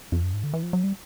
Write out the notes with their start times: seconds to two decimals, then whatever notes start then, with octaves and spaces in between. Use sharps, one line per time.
0.12 F2
0.23 F#2
0.33 G#2
0.44 D3
0.53 E3
0.63 F3
0.73 F#3
0.84 G3